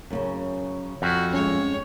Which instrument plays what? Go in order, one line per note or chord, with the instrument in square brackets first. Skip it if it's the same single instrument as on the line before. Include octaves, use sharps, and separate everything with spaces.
[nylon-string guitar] F#2 A#2 C#3
[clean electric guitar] F2 [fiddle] F#4
[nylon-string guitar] G2 G#3 [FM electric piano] C#4 [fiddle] C#5